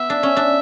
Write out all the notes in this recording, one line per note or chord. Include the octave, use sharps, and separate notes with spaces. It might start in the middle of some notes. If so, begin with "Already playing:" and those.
Already playing: B3 E5
D4
C#4
D4